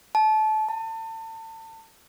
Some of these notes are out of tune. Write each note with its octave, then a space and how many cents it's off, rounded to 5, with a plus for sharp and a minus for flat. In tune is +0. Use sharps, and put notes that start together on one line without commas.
A5 -25
A5 +30